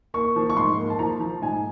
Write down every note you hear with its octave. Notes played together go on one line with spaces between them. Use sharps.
A#3 C#6
F3
C#6
G#2 C6
A#3
A5
F3 A#5
F3
G#2 G#5